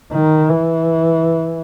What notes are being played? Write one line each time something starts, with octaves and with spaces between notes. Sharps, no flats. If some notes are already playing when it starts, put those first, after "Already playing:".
D#3
E3